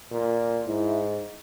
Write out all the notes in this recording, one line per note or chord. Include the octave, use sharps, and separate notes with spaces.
A#2
G#2 E4